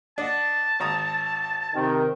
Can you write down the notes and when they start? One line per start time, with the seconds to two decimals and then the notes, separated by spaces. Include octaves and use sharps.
0.18 D4 D#5 F#5 A5
0.80 G#1 A#5 D#6
1.73 C3 D#3